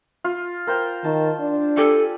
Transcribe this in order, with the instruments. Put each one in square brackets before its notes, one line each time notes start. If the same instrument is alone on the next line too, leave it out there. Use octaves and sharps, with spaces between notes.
[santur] F4
A#4 C5 G5
[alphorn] D#3 [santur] A5
[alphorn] D4
[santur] G4 D5 G#5 [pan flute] A4